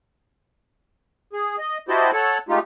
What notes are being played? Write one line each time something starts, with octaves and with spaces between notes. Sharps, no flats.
G#4
D#5
E4 F#4 G4 C5 D#5 A5
A4 C#5 F#5 A5
G#3 A3 D#4 F4 G4